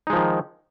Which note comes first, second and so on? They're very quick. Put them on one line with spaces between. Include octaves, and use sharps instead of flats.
D#4 G#3 F3 D#3